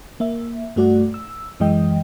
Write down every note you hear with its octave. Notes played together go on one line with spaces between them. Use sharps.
A#3 E5
G2 A3 F#4 D5 F#5
E6
F#2 E3 G#3 D#5 G5